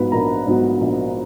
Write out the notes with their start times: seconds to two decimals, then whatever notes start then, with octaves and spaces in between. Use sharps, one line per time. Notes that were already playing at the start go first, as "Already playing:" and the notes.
Already playing: A#1 G#2 F#3 B3 B4 B5
0.12 A#1 A#4 A#5
0.47 G#2 F#3 B3
0.81 A#1